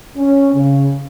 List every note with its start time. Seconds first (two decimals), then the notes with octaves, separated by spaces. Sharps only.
0.17 C#4
0.54 C#3